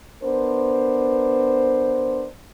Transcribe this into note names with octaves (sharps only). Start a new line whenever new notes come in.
B3 D4 A#4 C5